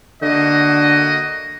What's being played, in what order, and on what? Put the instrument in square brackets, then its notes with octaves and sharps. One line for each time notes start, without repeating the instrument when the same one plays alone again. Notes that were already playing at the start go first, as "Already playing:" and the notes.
[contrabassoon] D3 [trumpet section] A#3 F#4 D#5